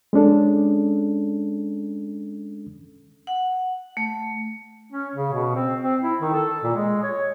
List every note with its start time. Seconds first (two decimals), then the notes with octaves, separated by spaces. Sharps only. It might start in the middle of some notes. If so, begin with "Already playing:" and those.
0.13 G#3 C#4 D4 A4
3.27 F#5
3.97 A3
4.92 C#4
5.15 C#3
5.32 B2
5.55 C4
5.81 C4
6.03 E4
6.21 D#3
6.33 A4
6.63 A#2
6.75 G#3
7.03 C#5